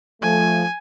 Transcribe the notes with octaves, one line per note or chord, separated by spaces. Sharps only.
F3 A3 G#5